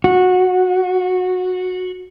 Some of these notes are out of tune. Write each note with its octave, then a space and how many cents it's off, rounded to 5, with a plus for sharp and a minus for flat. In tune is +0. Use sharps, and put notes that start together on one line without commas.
F#4 -15